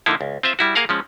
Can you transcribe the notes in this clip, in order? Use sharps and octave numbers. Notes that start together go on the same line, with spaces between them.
D3 F3 A#3 D#4 E4
C#2
C4 F4 C5 E5
G3 E4 F#4
A#3 G#4 A#4 F5 F#5
F3 G#3 C#4